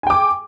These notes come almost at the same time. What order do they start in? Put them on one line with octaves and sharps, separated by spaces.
G#5 G5 D6